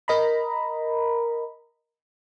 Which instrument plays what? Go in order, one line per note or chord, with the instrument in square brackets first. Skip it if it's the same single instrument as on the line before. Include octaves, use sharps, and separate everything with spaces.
[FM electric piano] A#4 D#5 A#5 B5